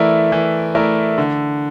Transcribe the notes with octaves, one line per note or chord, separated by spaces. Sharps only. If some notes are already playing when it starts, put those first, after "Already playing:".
Already playing: E3 A3 E4 A#4 D5
E3
A3 E4 A#4 D5
D3